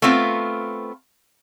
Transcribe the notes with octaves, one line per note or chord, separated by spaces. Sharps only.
A3 B3 C4 F4